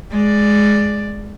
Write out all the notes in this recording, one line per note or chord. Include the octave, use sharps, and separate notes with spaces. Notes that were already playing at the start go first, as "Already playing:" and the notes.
G#3 D5